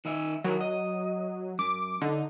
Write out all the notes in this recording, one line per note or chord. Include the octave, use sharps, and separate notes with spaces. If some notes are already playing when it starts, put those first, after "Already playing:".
D#3 D#4 E5
D#3 F#3 E4 A#4
D#5
F#2 D6
D3 D#4